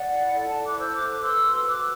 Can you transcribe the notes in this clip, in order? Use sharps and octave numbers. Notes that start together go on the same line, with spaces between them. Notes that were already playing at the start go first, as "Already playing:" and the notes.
Already playing: D5 F#5
E4
A4 D5
F#5 A5
E4
D6 F#6
C5 E6 G6
D6 F#6
A4
D6 F#6
B4 C6 E6
F#4
F#4 D6 F#6